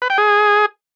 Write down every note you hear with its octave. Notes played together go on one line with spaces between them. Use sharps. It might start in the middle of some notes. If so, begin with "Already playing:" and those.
B4
G5
G#4